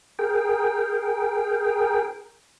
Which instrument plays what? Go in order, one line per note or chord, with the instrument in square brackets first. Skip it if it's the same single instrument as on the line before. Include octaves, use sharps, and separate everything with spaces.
[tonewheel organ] G#4 A#4 G5